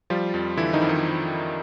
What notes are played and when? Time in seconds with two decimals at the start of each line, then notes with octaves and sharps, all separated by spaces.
0.10 F3 G3 F4
0.34 F2
0.57 D3 E3 E4
0.73 D#3 D#4
0.81 F2
0.89 D#3 D#4